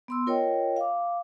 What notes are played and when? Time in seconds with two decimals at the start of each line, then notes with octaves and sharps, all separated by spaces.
0.08 B3 C6 E6
0.27 F4 A#4 C#5 D#5 G5
0.76 F5 D6